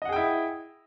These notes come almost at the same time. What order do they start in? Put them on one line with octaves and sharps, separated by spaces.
D#5 F#5 G#4 G5 E4